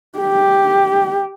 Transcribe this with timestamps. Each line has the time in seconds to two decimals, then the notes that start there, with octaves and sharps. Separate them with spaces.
0.18 G4